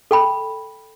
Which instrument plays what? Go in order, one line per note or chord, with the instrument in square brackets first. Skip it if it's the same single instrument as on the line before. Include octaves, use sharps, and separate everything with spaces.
[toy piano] A4 G5 B5